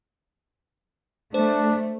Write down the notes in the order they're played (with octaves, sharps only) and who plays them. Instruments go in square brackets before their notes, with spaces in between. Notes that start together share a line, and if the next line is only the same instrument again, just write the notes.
[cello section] A3 [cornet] D4 [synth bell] C5